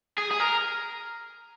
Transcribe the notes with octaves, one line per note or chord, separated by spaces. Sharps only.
G#4
G#4
A#4